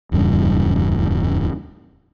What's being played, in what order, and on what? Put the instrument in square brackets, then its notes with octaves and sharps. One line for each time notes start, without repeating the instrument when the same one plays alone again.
[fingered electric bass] D1 E2 G2 C#3